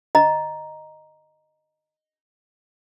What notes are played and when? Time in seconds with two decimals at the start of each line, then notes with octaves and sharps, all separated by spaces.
0.15 D#5 A#5